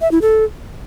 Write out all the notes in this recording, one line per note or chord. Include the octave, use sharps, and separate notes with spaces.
E5
E4
A4